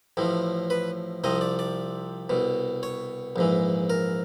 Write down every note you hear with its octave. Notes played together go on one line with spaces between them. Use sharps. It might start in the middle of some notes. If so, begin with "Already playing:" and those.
A1 A2 F3
B4
C2 C3 F3 D#5
D5
D5
C2 B2
C#5
A#1 G#2 E3
A#4